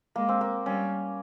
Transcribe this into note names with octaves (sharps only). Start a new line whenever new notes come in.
G#3 A#3
C4
A#3
G3 C#4